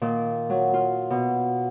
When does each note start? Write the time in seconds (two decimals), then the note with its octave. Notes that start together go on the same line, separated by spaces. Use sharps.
0.02 A#2 D#3
0.50 F#3
0.73 F4
1.10 B2